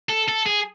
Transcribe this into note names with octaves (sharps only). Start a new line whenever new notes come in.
A4
A4
G#4